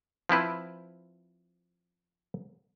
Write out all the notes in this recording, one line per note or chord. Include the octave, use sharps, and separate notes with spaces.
F3 C4 E4 B4